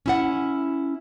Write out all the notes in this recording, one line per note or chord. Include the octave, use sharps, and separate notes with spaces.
C#4 E4 F#5